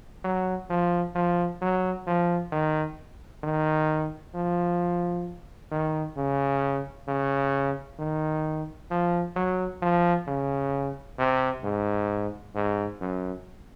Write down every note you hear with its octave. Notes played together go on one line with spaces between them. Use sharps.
F#3
F3
F3
F#3
F3
D#3
D#3
F3
D#3
C#3
C#3
D#3
F3
F#3
F3
C#3
C3
G#2
G#2
F#2